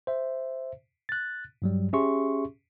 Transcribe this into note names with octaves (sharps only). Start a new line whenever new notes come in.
C5 E5
F#6 A6
G2 F#3 G3
C#4 G4 G#4 E5 C6 C#6